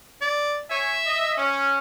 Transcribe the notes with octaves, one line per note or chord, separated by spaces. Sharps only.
D5
C#5 E5 G#5
D#5
C#4